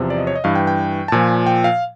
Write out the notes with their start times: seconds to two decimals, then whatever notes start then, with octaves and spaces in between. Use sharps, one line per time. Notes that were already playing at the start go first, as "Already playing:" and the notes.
Already playing: E2 C3 F3
0.10 D5
0.18 D#5
0.27 C#5
0.35 D#5
0.44 G2 E3 F5
0.55 G5
0.67 G5
1.08 A5
1.12 A#2 F3 G#5
1.46 G5
1.64 F5